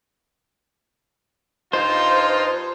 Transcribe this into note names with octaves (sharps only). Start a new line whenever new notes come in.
G2 D#4 F4 C5